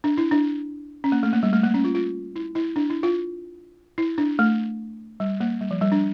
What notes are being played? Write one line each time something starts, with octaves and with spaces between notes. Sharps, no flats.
D4
E4
D4
C#4
A#3
A3
A#3
G3
A3
A#3
C#4
F4
F4
E4
E4
D4
E4
F4
E4
D4
A3
G3
A#3
G3
F3
G3
D4